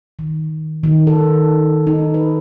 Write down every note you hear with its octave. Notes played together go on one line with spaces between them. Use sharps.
D#3
D#3
A4
D#4
B4